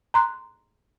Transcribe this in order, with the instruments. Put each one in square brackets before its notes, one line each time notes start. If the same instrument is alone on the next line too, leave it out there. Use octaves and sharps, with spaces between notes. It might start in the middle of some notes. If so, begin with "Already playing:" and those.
[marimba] A#5 C6 F#6